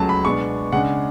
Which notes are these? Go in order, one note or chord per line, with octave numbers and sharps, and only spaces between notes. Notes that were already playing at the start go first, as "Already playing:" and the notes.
Already playing: C#2 C#3 F#3 A3 A5
B5
B2 G#3 B3 D4 C#6
C#3 G#3 D4 F#5